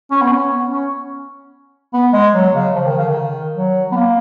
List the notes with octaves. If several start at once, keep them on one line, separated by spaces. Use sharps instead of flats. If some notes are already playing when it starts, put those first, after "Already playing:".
C#4
B3
C#4
B3
C#4
B3
G#3
F#3
C#3
F3
D#3
C#3
D#3
F#3
B3
A#3